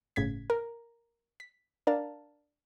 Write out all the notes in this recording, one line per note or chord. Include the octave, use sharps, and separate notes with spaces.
G1 A2 C#3 G#6 B6
A#4
B6
D4 A#4 F5 A5